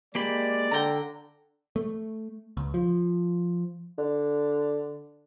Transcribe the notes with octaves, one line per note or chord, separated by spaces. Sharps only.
G#3 A#3 G4 D5 B5
D3 G5 A#5
A3
C#2
F3
D3